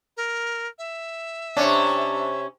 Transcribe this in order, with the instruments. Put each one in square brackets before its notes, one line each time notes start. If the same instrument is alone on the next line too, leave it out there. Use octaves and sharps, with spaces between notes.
[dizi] A#4
E5
[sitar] C3 C#4 [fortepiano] D4 C#5